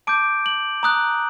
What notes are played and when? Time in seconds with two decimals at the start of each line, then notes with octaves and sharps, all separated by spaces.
0.07 A5 D6 G6 D7
0.46 F#7
0.83 A#5 D#6 F#6